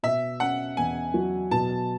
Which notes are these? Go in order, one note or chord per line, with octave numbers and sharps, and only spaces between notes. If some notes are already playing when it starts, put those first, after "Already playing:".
B2 E5
C#4 F#5
E2 G#5
F#3
B2 A5